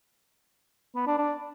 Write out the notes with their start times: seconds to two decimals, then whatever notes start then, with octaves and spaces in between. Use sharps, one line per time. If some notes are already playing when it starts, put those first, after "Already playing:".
0.95 B3
1.07 D4
1.18 D4